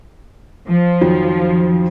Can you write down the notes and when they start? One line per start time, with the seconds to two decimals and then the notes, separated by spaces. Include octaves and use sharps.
0.67 F3
1.01 F2 D#3 F#3